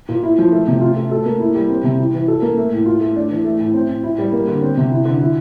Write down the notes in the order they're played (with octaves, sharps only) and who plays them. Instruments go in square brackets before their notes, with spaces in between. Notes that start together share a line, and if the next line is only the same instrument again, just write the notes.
[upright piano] A#2
E4
F3
A3
C3
F4
A3
A4
A#3
E4
G3
C4
C3
E4
E3
A4
A#3
A3
A2
F4
A3
D4
E3
A3
A2
C4
A2
E4
G3
A#3
D3
C4
C3
E4
D3
E4